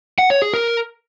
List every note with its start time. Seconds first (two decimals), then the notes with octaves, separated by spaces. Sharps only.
0.18 F#5
0.30 C#5
0.42 G#4
0.54 A#4